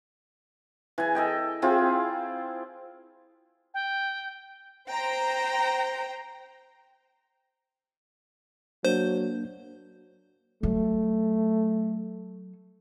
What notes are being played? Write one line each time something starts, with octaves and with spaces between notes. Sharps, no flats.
E3 G#5
A4 D#5 G5
C4 E4 F4 G#4
G5
C5 G5 A#5
F#3 A#3 D4 C5 G6
F#3 A3